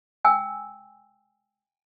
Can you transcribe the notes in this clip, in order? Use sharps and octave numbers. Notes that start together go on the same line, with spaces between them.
G5 G#5 E6